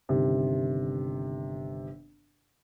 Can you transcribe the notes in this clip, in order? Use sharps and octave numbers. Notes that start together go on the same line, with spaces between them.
G1 C3 D#3